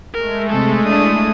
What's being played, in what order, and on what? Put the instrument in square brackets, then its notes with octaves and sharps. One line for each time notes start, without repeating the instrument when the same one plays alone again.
[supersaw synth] G#3 A3 [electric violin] A#4
[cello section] C3 [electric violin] A4
[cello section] A#3 D4 E4 [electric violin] D#6